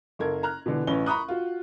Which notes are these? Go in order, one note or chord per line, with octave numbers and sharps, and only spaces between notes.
F#1 A4 A#4 G#6
A#5 F6 F#6
B2 D3 E3
A1 C#4 B4 G7
A#5 B5 C#6 D#6 F#6
F4 F#4